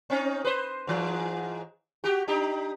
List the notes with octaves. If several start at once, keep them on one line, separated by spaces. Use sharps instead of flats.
C4 C#4 D#4
B4 C5
G#2 E3
F#4 G4
D4 D#4 G4